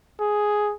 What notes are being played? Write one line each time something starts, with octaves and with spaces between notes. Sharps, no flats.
G#4